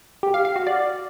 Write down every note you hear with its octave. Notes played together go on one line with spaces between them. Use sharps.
G4
F5
F5
F#4
D5